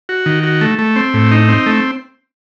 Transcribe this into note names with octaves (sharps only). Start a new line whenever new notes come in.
F#4
D#3
F#4
A3
A3
C4
A2
D#4
C4
A3